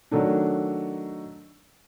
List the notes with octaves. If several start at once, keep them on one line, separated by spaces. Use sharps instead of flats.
D#3 F#3 A3 D4